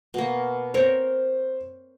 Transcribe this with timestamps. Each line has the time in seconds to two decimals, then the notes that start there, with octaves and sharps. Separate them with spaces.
0.14 B2 A#3
0.74 C4 A#4 C5 C#5